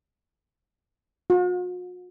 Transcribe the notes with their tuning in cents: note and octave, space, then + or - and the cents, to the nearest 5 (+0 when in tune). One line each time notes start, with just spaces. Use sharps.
F#4 -45